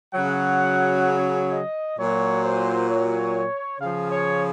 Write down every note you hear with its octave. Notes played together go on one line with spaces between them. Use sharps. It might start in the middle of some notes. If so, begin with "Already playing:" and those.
C#3 F#3 F#5
D#5
A#2 F#3 C#5
C5
C#5
C#3 F3 F5
C#5